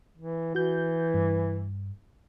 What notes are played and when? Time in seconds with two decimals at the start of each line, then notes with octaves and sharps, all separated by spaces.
0.18 E3
0.55 E3 F#4 G6
1.14 G2